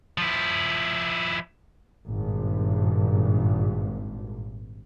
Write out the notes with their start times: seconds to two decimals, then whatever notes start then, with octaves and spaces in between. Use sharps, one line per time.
0.18 F3 E4
2.07 G#1 G2 A#2